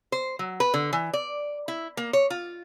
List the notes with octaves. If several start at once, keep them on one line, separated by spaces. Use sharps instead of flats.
C5
F#3
B4
D3
E3
D5
E4
A#3
C#5
F4